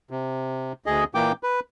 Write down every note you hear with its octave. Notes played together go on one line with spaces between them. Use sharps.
C3
D2 G#4 D#5
A#2 E3 A#3 G5 D6
B4